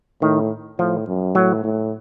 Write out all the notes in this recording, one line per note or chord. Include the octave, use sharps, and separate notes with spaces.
A2 D#3
A2 F3
F#2
A2 F#3
A2